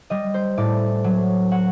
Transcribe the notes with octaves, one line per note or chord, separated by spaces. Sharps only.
G3 D#5
C5
A2 D5
F#3
F#5